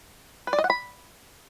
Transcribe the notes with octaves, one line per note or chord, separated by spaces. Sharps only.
B4
D5
D#5
F#5
B5